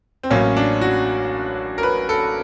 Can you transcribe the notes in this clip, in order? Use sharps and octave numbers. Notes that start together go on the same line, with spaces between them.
C4
A1 A2 F#3 A#3 C#4
D4
F#4
A#4
B4
A4